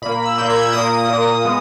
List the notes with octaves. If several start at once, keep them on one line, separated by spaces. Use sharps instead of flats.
A#2 A#3 B5
E6
A#2 A#3 G6
G#6
E6
A#2 A#3 D#6
A#2 A#3
G#3 B3